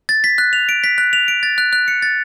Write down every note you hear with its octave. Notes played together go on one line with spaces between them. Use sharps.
A6
B6
F#6
F7
D7
B6
F#6
F7
D7
A6
F#6
F#6
C#7
A6